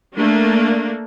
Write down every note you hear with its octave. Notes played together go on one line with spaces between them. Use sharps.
A3 A#3 D4